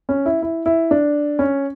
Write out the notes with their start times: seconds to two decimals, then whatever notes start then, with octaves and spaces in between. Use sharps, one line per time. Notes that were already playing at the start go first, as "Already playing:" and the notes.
0.09 C#4
0.26 E4
0.42 E4
0.66 E4
0.91 D4
1.39 C#4